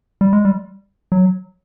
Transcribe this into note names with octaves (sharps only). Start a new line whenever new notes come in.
G3
G#3
G3
F#3